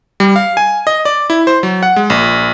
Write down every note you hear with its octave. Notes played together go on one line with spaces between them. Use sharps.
G3
F5
G#5
D#5
D5
E4
C5
F#3
F#5
G#3
A#1